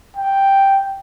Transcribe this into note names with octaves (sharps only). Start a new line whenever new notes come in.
G5